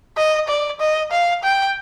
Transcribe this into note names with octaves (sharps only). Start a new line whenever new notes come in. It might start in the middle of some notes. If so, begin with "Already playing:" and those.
D#5
D5
D#5
F5
G5